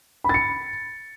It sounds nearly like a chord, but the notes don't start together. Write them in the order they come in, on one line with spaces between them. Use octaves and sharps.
B5 A6 C#7